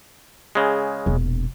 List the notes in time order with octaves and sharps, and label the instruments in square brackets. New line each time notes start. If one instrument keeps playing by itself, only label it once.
[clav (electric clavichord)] C#3 G#3
[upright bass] E1 A#1